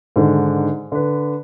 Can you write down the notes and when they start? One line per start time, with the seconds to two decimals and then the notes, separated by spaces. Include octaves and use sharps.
0.16 G#2 D3 D#3
0.92 D3 B4